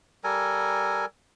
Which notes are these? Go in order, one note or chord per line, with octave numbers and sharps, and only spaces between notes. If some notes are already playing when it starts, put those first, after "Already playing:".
G3 A4 A#4 G#5